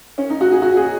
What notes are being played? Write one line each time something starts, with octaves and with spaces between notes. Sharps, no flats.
C#4
D#4
F#4
G#4
F#4
G#4